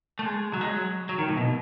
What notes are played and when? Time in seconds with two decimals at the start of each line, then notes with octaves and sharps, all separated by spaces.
0.19 A3
0.25 G#3
0.53 F#3
0.61 G#3
0.69 F#3
1.09 F#3
1.18 D#3
1.28 A2
1.37 B2